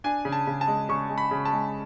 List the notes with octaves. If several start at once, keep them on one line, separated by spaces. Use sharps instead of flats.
D4 G#5
C#3
A5
C#3
A5
G#3
C#3 C#6
G#3
B5
C#3
A5
G#3